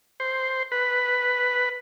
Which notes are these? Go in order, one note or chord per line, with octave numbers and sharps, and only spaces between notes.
C5
B4